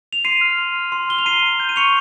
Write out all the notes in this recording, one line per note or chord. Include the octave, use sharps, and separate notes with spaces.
F7
C6 C7 D#7
F6
C6
F6
C6
F6 G7
F7
A#5 C7 D#7
A#5
G6
D#7
C#6 C#7 F7